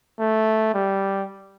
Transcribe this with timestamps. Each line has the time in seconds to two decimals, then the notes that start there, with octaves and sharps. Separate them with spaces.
0.18 A3
0.74 G3